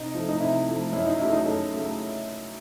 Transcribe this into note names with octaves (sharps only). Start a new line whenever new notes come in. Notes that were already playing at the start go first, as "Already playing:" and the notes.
Already playing: C3 D#4
F3 A3
D#4
C3 E4
F3 A3
F#2 E4
D#4
C#3 F#3 A3 E4
D#4
F#2 A4
C#3 F#3 A3